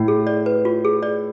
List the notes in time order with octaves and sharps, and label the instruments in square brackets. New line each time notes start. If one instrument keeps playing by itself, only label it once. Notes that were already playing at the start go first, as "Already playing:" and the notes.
Already playing: [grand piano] A2
[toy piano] G#4
D5
B4
F4
G#4
D5